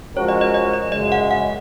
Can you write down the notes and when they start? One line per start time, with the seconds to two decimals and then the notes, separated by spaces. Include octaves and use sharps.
0.16 F3 G#3 C#4 F#4 A#4 C#5
0.28 D#5
0.41 D#5
0.54 D#5
0.74 D#5
0.92 F#2 C#3 G#3 D#5
1.12 F#5
1.31 F#5